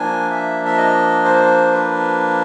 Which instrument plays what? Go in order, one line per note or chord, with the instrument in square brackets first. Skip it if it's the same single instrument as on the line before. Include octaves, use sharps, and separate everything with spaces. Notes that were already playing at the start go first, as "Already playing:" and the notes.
Already playing: [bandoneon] F3 A#3 D4 G#5
E5
E5
D#5
C5
B4